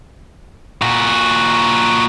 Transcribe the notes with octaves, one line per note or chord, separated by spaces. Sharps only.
A#2 F#4